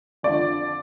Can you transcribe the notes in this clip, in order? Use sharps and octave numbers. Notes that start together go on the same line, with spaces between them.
F2 D3 F3 D5